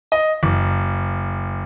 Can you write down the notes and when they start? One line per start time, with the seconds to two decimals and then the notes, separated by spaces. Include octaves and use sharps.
0.12 D#5
0.43 F#1